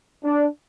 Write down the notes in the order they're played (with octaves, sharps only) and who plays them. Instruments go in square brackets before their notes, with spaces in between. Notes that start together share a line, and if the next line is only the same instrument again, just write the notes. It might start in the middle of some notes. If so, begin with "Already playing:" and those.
[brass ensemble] D4